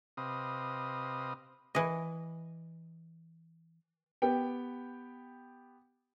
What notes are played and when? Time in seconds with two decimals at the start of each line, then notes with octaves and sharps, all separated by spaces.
0.17 C3 C4 B4 D#5 F5 D#6
1.75 E3 D#5
4.22 B3 G4 G5